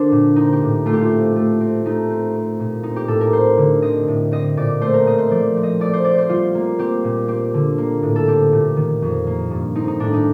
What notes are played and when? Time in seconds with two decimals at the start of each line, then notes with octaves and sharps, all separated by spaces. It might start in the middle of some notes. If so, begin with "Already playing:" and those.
Already playing: D3 C4 D4 A#4 C5
0.12 A#2
0.36 C4 D#4
0.53 G4
0.62 A2
0.86 A3 F4
0.93 G4
1.01 F4
1.11 C4
1.36 A3
1.60 C4
1.85 A3 D#4
2.10 C4
2.35 C4
2.60 A#2
2.83 C4 D#4
2.96 G4
3.08 A2 A4
3.21 A#4
3.33 C4 C5
3.58 D3
3.82 C4 D#5
4.08 A2
4.32 C4 D#5
4.57 A#2 D5
4.81 A3 C5
4.94 A#4
5.06 C4 D#5
5.18 C5
5.30 F3 D5
5.56 C4
5.63 D#5
5.80 A3 D5
5.93 C5
6.05 C4 D5
6.18 C5
6.29 G3 F4
6.55 A#3
6.79 C4 G4
7.04 A#2
7.28 C4 G4
7.54 D3
7.78 A#3
8.02 A2
8.16 A4
8.27 C4 G4
8.53 A#2
8.76 D#3
9.02 F2
9.27 A#3
9.51 G2
9.75 C4 D#4
9.88 D#4
10.00 A2 D4
10.14 D#4